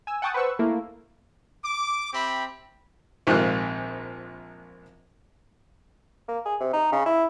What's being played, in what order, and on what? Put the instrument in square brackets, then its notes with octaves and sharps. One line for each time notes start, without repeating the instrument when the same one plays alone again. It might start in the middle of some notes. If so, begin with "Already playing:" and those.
[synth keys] G#5 E6
F#5 G5 A5 C#6 D#6
B4 C5 F#5 C#6 E6
A3 A#3 E4
[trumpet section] D6
C4 G4 E5 B5
[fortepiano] A#1 G#2 C3 D#3 F4 F#6
[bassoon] A#3
G#4
C3
D#4
C#3
E4